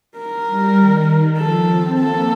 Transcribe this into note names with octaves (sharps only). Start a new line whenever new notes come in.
A#4
G3
D#3
D#3
F3 A4
C4
A#3 A4